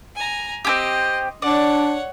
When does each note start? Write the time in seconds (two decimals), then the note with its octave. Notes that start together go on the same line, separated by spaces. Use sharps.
0.15 G#5 A#5
0.65 C4 C#4 G4 D#5 C6
1.42 D4 C#5 D5 F#5